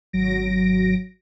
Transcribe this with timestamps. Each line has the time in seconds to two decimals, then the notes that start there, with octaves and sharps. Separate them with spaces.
0.13 G#1 F#3 A#6 D7